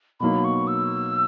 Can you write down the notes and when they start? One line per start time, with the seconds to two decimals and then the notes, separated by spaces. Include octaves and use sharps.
0.20 B2 F#3 A#3 D#4 B5
0.44 C#6
0.67 E6